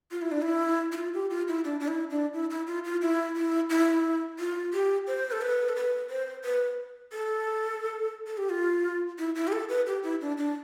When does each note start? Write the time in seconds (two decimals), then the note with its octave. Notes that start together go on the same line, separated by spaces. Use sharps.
0.11 F4
0.22 E4
0.32 D4
0.42 E4
0.92 E4
0.97 F4
1.14 G4
1.30 F4
1.48 E4
1.65 D4
1.80 D4
1.88 E4
2.10 D4
2.34 E4
2.50 E4
2.67 F4
2.84 F4
3.02 E4
3.36 E4
3.70 E4
4.39 F4
4.73 G4
5.07 C5
5.32 A4
5.42 B4
5.69 A4
5.76 B4
6.10 C5
6.44 B4
7.12 A4
8.27 A4
8.38 G4
8.50 F4
9.19 E4
9.35 E4
9.48 G4
9.52 A4
9.69 B4
9.87 G4
10.03 E4
10.21 D4
10.37 D4